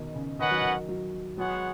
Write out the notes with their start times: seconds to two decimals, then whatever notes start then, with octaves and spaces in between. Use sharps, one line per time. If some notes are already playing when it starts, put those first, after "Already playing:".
Already playing: B2 D#3
0.15 C#3
0.39 D#3 C#4 B4 D#5 F#5
0.51 F#3
0.62 D#3
0.89 F#3
1.38 F#3 G#3 B3 G#4 C#5 F#5